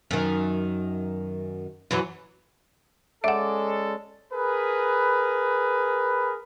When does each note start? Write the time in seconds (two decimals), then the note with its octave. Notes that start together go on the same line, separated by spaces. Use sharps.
0.11 F#2 D#3
1.91 F#2 E3 F#3
3.24 G#3 C#4 A4 D5 E5 F#5
4.32 G#4 A#4 B4